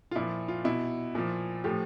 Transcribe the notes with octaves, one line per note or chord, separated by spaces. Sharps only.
F4
A#2 F3 E4
F4
B2 E4
A#2 F3
A2 F3 G4